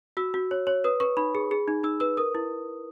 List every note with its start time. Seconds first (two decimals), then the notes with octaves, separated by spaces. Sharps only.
0.17 F#4 E6
0.34 F#4
0.51 C#5
0.67 C#5
0.84 B4 D#6
1.00 B4 C#6
1.17 D#4 B5
1.35 G#4
1.51 G#4
1.68 D#4
1.84 D#4 E6
2.00 B4 E6
2.17 A#4 D#6
2.35 E4